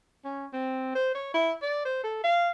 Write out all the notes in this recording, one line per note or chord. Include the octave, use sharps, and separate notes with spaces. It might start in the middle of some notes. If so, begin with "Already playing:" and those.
C#4
C4
C5
C#5
E4
D5
C5
A4
F5